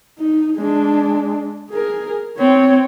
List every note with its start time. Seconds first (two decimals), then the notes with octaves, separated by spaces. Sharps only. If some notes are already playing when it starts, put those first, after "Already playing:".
0.19 D#4
0.57 G#3 D4
1.71 G#4 A#4
2.37 C4 C#5